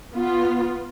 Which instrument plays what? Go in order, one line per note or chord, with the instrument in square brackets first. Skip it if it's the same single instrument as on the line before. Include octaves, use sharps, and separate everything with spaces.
[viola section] B3 F4